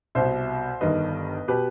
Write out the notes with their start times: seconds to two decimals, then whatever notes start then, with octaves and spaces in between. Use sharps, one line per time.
0.15 C2 B2 C5 E5
0.81 G1 G2 D#3 B4 D#5
1.48 B2 G4 B4